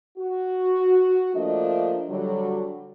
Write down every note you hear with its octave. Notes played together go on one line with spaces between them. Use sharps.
F#4
F3 A3 A#3 D4 D#5
D3 F#3 G3